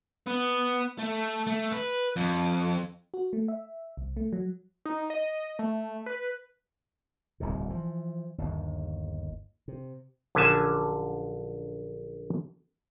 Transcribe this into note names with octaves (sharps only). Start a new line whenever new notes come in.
B3
A3
A3
B4
F2
F#4
A3
E5
C2
A3
F#3
D#4
D#5
A3
B4
D1 C2 G#2 C3
E3 F3
G1 D#2
C3
A#1 D3 F#3 C#4 G#5 A5